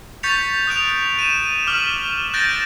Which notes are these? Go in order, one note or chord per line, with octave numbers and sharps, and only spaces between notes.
C#6 G6 A6 B6 C#7 F7
D#6 F#6 D7 F7
D#7 E7
D6 F6 F#7
F#6 G6 A6 A#6 D7